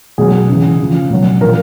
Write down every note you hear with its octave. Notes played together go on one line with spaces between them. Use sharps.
B2 F#3 G#4
C#3 E3
C#3 F3
B2 F#3
A#2 F3 A#4